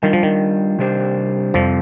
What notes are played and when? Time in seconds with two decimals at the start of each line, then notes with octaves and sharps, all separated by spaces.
0.03 D#3 G3 D4 F4
0.13 F3
0.23 D#3
0.79 C3 G3 D4 G4 C5
1.54 F2 C3 F3 G3 C4